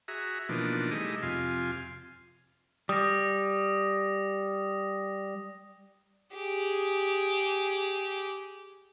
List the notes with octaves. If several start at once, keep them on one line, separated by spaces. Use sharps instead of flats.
F#4 G#4 E5 A#5
B2 E3 F3 A#3 D4 D#4
G3 A3 D#4 E4 G#4 D#5
F2 C3 F4 F5 G#5
G3 D#6 A#6
G4 G#4